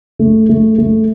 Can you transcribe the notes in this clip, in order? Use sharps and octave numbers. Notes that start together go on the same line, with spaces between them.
A3
A3
A3